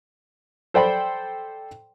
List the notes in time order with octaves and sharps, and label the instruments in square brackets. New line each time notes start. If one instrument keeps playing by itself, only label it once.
[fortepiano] A4 C5 D5 G5 B5